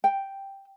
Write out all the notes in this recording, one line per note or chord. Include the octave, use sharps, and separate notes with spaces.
G5